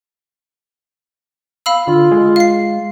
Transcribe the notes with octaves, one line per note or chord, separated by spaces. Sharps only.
F5 B5 E6
D3 F4
G#3
F5 C7